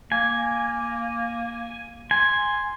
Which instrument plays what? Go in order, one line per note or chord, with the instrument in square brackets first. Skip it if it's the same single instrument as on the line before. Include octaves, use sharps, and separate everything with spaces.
[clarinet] A#3 [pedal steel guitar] G#5
[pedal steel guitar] G#5 [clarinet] C6